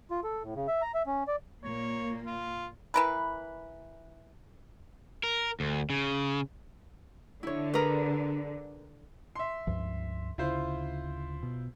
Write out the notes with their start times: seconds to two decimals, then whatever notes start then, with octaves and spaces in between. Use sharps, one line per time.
0.11 F4
0.24 A4
0.43 A2
0.55 C#3
0.68 E5
0.82 A#5
0.94 E5
1.07 C#4
1.28 D5
1.64 A#2 A#3 C#5
2.26 F4
2.94 E3 A#4 B4
5.23 A#4
5.60 D2
5.90 C#3
7.43 D3 E4 C#5
7.74 G#4 A#4 B4
9.35 E5 C6
9.67 C#2 G2 F3
10.38 D2 C#3 E4 F4 C5
11.43 B2